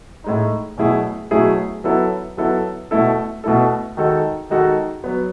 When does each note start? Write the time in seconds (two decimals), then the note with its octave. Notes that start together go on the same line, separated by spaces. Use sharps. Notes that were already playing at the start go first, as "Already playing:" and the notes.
0.24 A2 G#3 D#4
0.78 B2 F#3 A3 E4 G#4
1.31 B2 F#3 A3 E4 G#4
1.84 F#3 B3 E4 A4
2.37 F#3 B3 E4 A4
2.91 B2 A3 E4 A4
3.44 B2 A3 E4 A4
3.97 D#3 G#3 D#4 F#4 A4
4.50 D#3 G#3 D#4 F#4 A4
5.04 F#3 B3